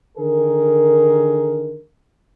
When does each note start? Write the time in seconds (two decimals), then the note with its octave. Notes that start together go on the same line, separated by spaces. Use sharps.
0.17 D3 D#3 G#4 A#4